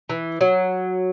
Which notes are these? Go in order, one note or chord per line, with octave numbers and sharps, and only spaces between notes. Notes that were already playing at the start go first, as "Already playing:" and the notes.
E3
F#3